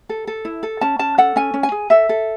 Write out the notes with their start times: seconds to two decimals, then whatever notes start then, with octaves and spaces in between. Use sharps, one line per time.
0.09 A4
0.27 A4
0.45 E4
0.63 A4
0.81 C#4 A5
0.99 C#4 A5
1.18 A4 F#5
1.36 C#4 G#5
1.54 C#4
1.63 G#5
1.72 G#4
1.90 A4 E5
2.09 A4